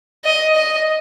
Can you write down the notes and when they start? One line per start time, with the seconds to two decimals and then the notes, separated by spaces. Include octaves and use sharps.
0.25 D#5
0.56 D#5